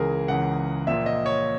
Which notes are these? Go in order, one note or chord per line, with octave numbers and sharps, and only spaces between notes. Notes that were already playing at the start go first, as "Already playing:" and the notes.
Already playing: C#2 C#3 E3 G#4 A#4
C#2 C#3 E3 F#5
A#1 A#2 E5
D#5
C#5